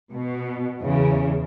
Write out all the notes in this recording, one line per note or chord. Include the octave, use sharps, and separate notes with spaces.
B2
E2 C#3